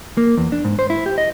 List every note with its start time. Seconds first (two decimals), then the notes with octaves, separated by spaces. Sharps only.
0.17 A#3
0.37 E2
0.52 D4
0.65 G#2
0.79 C5
0.90 E4
1.06 G4
1.18 D#5